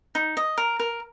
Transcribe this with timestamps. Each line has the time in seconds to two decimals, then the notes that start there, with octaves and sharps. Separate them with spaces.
0.15 D#4
0.37 D#5
0.58 A#4
0.79 A#4